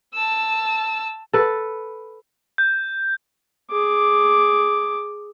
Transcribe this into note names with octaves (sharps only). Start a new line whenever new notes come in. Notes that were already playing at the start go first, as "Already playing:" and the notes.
A5 E6
A4 B4
G6
G#4 D6